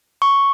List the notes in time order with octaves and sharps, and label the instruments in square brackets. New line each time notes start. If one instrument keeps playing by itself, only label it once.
[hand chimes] C#6